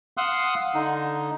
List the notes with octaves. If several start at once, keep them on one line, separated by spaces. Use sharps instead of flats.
F5 F#5 C6 D#6 E6 F#6
D3 D#4